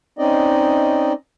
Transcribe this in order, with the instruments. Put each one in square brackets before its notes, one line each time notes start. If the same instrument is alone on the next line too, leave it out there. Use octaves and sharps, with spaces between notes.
[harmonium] C4 C#4 D#4 D5 D#5